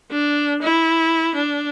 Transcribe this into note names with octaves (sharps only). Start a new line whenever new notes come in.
D4
E4
D4